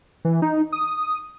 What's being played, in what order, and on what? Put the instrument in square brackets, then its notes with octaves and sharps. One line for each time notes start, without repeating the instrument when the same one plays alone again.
[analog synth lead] E3
D#4
D#6